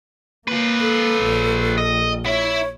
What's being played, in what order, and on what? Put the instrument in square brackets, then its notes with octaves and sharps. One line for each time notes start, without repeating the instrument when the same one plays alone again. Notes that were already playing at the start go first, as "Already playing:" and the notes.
[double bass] A#3 [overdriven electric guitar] F4 B4
[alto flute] A4
[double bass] A#1
[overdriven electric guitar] D#5
[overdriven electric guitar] E4 E5 [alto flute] C#5